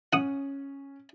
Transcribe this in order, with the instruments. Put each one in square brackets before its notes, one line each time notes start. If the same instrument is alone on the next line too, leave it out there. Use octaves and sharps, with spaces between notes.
[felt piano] C#4 [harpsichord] F#5 D#6